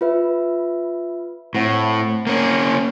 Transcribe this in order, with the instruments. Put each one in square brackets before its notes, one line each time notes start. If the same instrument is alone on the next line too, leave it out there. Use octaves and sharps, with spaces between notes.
[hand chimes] F4 B4 E5
[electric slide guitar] A2 [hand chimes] C4 C5 F#5
[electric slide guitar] A#3 C#4